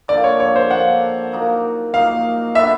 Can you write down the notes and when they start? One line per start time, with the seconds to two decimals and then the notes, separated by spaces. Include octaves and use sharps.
0.08 D3 F3 A#3 D5
0.24 C#5
0.40 C#5
0.56 C5
0.70 D3 F3 A#3 F#5
1.32 A#2 F#3 A#3 D#4
1.94 A#2 F#3 A#3 D#4 F5
2.55 D3 F#3 B3 D4 E5